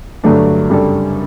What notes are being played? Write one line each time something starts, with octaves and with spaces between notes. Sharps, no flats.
G2 D3 F#3 A3 D4
F#2 C#3 G3 D4 A4